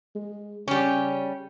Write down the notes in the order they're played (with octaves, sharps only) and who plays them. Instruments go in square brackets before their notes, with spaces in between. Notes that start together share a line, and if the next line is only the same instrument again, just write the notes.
[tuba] G#3
[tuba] C#3 [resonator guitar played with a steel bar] G3 C#4